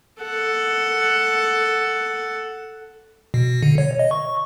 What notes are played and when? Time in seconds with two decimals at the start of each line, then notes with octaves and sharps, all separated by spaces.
0.22 A4 F#5
3.34 B2
3.63 D3
3.78 C#5
3.99 D#5
4.11 C#6